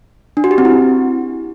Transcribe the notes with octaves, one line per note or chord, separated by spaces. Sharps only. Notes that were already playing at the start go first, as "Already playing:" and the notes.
D4
F#4
G4
C4
E4